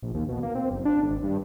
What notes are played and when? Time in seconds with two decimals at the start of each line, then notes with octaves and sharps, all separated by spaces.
0.02 A#1
0.14 D#2
0.29 B2
0.43 A#3
0.55 C4
0.71 F#1
0.85 D4
1.03 G#1
1.23 G2